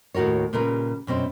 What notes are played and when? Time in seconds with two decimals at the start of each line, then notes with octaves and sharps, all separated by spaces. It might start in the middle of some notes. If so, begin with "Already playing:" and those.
0.14 D#2 A2 F#4 A#4 C#5
0.53 A#2 C#3 G3 A#4 B4
1.07 F#2 B2 C4 C5